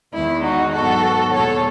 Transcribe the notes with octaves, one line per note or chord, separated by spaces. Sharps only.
E2 D#3 G#3 B3 E4
D#4 F#4
G#2 D#3 F#3 B3 F#4 A4
E2 B2 G#3 B3 A4 C#5